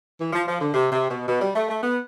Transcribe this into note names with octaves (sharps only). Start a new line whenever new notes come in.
E3
F3
F3
D3
C3
C3
B2
B2
G3
A3
A3
B3